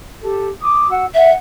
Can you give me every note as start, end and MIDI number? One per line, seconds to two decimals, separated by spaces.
0.20 0.47 67
0.20 0.47 69
0.60 0.87 86
0.60 0.87 87
0.88 1.04 66
0.88 1.04 78
0.88 1.04 88
1.14 1.31 76
1.14 1.34 78